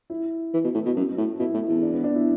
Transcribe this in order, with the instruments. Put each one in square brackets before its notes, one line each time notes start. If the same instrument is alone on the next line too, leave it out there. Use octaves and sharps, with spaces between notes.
[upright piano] E4
[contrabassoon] E3
B2
A2
B2
F#2
A2
[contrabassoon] B2 [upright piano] E4
[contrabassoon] A2
E2
[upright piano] D4
B3
D4
E4